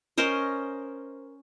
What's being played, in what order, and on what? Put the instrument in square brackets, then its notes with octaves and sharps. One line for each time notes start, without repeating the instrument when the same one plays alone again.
[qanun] C#4 A#4 C5 D#5